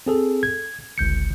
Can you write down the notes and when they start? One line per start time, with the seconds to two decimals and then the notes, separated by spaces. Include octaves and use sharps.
0.06 C4 G#4 A4
0.43 G#6
0.98 G1 C#2 G6 C#7